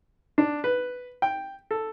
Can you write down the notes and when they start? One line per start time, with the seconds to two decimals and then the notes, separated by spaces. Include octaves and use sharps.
0.38 D4
0.64 B4
1.22 G5
1.71 A4